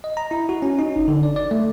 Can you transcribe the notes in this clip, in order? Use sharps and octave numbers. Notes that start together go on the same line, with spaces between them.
D#5
A#5
E4
F#4
C#4
D#4
G1
D3
D5
D5
A3